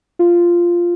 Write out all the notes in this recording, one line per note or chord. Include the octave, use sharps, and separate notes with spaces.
F4